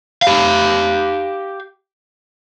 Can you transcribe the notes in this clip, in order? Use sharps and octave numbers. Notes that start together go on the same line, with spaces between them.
G4 F5